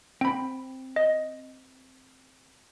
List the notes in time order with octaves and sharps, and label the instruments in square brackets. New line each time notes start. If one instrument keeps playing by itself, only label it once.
[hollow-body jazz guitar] C4 B5 [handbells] G5
[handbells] D#5